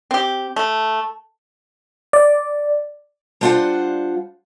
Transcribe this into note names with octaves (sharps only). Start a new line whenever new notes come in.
C4 G4
A3
D5
G3 D4 F4 C5 F5 F#5